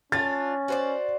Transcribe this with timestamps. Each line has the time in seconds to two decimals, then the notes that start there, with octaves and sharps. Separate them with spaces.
0.12 C#4 D4 F4 A6
0.68 F#4 C5 D5